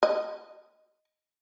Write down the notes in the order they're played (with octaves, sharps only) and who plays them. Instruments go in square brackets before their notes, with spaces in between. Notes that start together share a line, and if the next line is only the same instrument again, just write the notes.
[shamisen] D#5